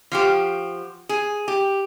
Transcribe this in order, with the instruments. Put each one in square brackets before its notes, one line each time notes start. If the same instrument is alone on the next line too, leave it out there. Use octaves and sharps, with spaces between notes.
[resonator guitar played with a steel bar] F3 F#4 G4
G#4
G4